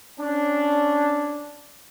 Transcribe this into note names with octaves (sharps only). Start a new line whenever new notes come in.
C#4 D4